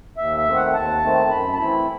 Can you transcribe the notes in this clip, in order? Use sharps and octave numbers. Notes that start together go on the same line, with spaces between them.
D#2 E5
E5
D#3 A3 C4
F#5
D#2 A5
D#3 A3 C4
F#2 B5
A5
E3 A3 C4 E4 B5